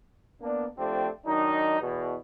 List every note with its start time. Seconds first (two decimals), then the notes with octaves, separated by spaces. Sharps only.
0.41 A#3 B3 D4
0.78 F3 A3 C4 D4 G4
1.26 D#3 F#3 D4 D#4
1.81 E2 B2